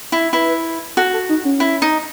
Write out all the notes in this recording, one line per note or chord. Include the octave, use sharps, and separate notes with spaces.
E4
E4 B4
F#4 A4
A4
D#4
C#4
E4
D#4